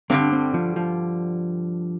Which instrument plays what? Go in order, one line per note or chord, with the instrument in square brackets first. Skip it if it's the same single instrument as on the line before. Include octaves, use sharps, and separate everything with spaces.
[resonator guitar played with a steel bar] G2 D3 G3 [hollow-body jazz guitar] C4
[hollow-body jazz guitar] C4
F3
F3